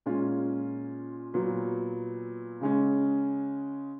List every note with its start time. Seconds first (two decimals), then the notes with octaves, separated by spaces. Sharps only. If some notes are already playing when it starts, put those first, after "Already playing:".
0.06 A#2 G#3 C#4 F4
1.34 A#2 F#3 B3
2.61 C#3 G#3 C#4